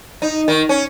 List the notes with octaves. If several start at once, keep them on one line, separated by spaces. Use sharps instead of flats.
D#4
D#3
C#4